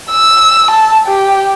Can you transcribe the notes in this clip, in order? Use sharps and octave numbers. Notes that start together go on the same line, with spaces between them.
E6
A5
G4